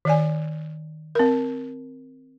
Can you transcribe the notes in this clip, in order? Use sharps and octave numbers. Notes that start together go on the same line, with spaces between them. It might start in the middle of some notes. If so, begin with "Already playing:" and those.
D#3 D5 G#5
C4 A#4